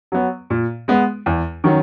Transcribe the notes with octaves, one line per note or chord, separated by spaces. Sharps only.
F#3 B3
A#2
G#3 B3
E2
D#3 F#3 C#4